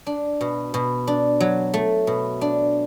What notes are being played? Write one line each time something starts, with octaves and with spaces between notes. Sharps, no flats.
D4
B2
B2
D4
F#3
A3
B2
D4